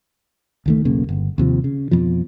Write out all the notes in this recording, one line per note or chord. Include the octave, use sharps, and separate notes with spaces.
C#2 D#3 A3
E1 B1 C#3 A#3
G1
D#2 C3 F3
C#3
F2 B2 F3